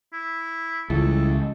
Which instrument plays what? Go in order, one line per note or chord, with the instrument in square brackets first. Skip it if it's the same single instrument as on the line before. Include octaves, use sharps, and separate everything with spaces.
[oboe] E4
[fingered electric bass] C#2 [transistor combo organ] E3 G3 E4 [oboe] A4